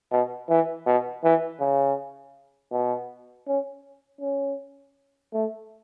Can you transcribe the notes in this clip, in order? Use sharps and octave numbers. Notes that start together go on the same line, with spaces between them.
B2
E3
B2
E3
C#3
B2
C#4
C#4
A3